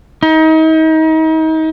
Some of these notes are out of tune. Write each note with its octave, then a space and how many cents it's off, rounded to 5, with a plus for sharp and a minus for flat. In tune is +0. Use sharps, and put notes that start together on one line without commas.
D#4 +35